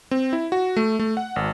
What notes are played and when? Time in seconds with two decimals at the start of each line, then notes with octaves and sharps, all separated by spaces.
0.11 C4
0.33 E4
0.52 F#4
0.77 A3
0.99 A3
1.17 F#5
1.36 G#1